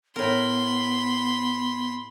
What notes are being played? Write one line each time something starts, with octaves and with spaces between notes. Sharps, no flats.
A2 B3 A#4 B5 C6